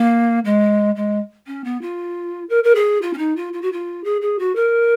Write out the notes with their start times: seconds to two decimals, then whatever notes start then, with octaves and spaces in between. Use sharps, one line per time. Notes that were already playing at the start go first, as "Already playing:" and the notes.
Already playing: A#3
0.45 G#3
0.96 G#3
1.47 C#4
1.64 B3
1.82 F4
2.49 A#4
2.64 A#4
2.75 G#4
3.02 F4
3.13 C#4
3.18 D#4
3.36 F4
3.53 F4
3.62 F#4
3.73 F4
4.04 G#4
4.22 G#4
4.39 F#4
4.56 A#4